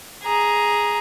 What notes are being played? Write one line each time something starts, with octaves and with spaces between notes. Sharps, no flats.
G#4 A#5